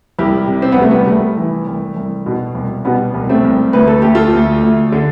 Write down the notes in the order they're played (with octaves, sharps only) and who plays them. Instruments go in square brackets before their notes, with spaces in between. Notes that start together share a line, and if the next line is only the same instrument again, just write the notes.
[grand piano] C2 E4 G4
C3
C4
B3
C2 A3
G3 B3
C2 A3
E3
C2
C2
B2
C2
B2 G3 B3
C2
A3 C4
C2
D2 B4
A4
D2 G4
F4 A4
D2
D2
D3